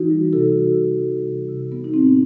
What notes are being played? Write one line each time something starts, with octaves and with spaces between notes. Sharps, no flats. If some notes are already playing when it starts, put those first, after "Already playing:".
Already playing: E3 D#4 F#4
G3
C3 F#4 A4
C3
E3
G3
C3
C3
G3 B3
D#4
A2 C4
B3